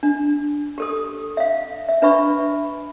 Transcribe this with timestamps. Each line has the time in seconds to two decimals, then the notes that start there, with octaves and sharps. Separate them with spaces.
0.03 D4
0.78 G4 A4 D#6
1.37 E5 F5
1.89 E5
2.02 D4 B4 E5 B5 C#6